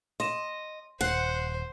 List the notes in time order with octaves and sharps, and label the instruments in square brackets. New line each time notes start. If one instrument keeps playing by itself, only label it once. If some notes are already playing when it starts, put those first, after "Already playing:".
[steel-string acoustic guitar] D#5 [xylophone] C6 E7
[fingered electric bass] D#1 [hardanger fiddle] C5 [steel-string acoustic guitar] F#5 [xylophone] F#6 C7